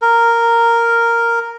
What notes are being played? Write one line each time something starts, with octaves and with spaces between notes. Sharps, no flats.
A#4